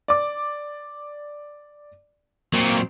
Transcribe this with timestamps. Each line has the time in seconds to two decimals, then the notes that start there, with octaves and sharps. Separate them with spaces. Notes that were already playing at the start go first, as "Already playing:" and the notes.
0.08 D5 D6
2.54 A#2 F#3 C4